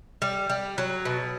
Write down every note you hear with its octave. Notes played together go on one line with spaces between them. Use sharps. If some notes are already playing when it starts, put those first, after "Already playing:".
G3
G3
F#3
B2